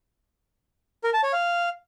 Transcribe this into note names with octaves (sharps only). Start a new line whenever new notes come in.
A#4
A5
C#5
F5